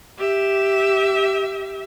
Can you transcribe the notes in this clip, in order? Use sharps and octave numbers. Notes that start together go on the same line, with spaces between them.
G4 E5